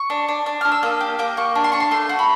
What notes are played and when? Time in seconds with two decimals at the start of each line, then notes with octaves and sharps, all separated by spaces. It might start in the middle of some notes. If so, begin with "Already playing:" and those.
Already playing: C#6
0.10 D4
0.28 D4
0.46 D4
0.61 D4 F6
0.72 E6
0.83 A#3 D#6
1.01 G4
1.19 A#3 D6
1.37 A#3 C#6
1.55 D4
1.64 C6
1.72 D4 C#6
1.80 C6
1.91 A3 C6
2.09 F#4
2.19 B5